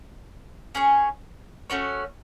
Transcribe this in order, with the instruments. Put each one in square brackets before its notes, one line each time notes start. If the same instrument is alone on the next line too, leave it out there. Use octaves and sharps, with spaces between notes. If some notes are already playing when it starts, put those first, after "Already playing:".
[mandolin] C#4 G#4 C#5
A3 C#4 F#4 C#5